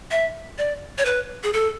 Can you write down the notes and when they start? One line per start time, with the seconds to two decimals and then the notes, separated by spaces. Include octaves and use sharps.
0.11 E5
0.58 D5
0.98 C#5
1.05 B4
1.43 G#4
1.53 A4